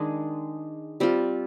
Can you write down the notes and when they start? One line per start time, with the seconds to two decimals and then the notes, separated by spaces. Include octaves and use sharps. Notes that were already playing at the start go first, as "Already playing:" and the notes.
Already playing: D#3 G#3 D4 G#4
1.00 G3 C4 F4